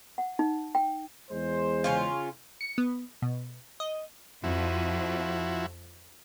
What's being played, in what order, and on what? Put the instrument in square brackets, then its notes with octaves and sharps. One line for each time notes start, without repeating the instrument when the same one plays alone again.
[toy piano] F#5
D#4
G5
[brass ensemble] E2 G#3 C5
[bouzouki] C#3 C#4 F4
[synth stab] C#7
B3
B2
D#5
[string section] F2 [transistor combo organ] F3 E4 F#4